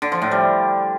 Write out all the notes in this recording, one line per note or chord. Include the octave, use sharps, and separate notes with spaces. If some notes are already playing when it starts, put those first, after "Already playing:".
D3
F3
A2
G3